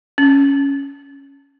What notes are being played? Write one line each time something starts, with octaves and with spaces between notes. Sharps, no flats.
C#4